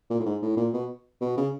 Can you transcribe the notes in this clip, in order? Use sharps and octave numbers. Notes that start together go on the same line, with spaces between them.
A#2
A2
G#2
A2
A#2
B2
B2
C#3